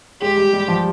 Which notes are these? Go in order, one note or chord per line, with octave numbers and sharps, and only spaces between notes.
G#3 G4
G3
G3
F3